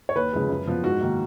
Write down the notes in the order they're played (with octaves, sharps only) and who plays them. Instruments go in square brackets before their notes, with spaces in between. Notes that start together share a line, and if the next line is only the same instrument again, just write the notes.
[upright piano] C#5
D#2 B4
C#3 F3 G#3
F#2
F3 B3
G#2 F#4
D#3 A#3